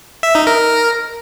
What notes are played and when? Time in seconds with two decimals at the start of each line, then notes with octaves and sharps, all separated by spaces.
0.23 E5
0.35 D#4
0.47 A#4